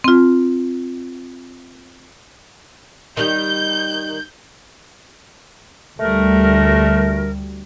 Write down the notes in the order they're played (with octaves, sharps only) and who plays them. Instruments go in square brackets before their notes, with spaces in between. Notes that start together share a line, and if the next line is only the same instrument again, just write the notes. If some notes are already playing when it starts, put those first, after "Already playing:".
[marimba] C4 F4
[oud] D#3 G3 [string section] G6
[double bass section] D2 G3 [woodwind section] A3 A#4